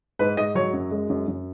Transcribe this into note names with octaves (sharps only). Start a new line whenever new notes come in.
G#2 B4
G#2 D#5
F#3 C#5
F#2
G#3
F#2
F#2